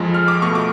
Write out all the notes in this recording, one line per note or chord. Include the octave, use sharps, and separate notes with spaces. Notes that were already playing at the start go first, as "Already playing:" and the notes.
Already playing: F2 F3 G#3
F6
D6
B2 A3 C#6
D6